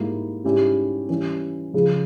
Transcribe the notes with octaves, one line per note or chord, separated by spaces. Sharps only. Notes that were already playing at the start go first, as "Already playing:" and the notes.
Already playing: G#2 G3 A#3 E4
G#2 G3 C#4 E4 G4
E3 G3 C#4
C#3 F3 G#3